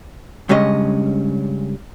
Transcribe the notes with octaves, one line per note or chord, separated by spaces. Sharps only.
G2 C#3 G#3 C#4 D#5